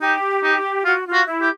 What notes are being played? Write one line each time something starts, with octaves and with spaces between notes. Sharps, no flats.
D#4 G4
D#4
F4 F#4
F4
F#4
E4
G4